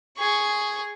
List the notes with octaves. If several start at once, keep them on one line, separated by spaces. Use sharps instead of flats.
G#4 C#6